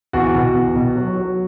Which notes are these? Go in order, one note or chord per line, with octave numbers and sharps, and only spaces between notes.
E2 F#4
B2
E2
B2
F#3
F#3